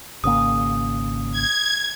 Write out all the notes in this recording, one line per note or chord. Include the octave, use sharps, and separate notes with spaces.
G#1 C#3 A#3 D#6
G#6